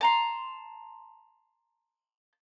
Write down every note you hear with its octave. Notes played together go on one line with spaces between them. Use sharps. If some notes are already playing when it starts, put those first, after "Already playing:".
A5 A#5 C6